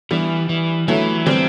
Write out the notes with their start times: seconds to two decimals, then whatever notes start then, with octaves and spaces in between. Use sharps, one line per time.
0.11 E3 G3 B3
0.49 E3
0.88 E3 F#3 A3
1.26 E3 G3 C4